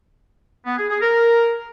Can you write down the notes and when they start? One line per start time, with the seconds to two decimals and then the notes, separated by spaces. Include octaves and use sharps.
0.66 B3
0.78 G#4
0.90 G#4
1.02 A#4